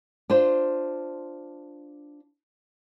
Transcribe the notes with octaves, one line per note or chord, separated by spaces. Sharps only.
D4 F4 C5